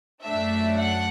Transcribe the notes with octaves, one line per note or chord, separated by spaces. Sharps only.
F#2 F#3 A3 D4 E5
F#5